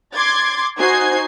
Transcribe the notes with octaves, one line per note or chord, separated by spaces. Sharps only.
C6 D6 G#6 A6
D#4 F#4 C5 G#5 G#6 C7